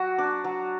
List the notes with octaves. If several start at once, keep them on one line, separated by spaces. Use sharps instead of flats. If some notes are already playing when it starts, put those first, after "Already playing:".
Already playing: F#3 F#4
D4
F#3